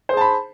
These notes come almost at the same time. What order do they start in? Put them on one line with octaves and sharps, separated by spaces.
C5 G#4 A5 B5